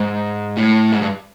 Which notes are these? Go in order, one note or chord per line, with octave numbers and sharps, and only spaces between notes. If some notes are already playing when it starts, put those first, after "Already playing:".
Already playing: G#2
A2
G#2
G2